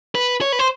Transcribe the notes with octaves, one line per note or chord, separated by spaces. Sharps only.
B4
C#5
B4
C5